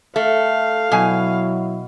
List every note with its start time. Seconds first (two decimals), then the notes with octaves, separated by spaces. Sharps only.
0.16 A3 F5
0.92 B2 F#3 E4 G#5